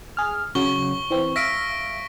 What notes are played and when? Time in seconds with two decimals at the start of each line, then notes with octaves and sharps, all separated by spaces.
0.17 G#4 F6
0.55 C#3 F#3 C#6 G7
1.10 E3 C4
1.36 E5 F5 A#6 B6 D7